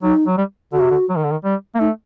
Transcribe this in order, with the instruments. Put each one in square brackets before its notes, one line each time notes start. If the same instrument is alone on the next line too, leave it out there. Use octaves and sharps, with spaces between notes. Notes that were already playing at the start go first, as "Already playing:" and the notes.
[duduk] F#3 [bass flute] D#4
[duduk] F#3
G3
[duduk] D3 [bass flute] F#4
[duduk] C3
D3
F#3
D#3
D3
D#3
G3
A#3
[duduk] A3 [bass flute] D#4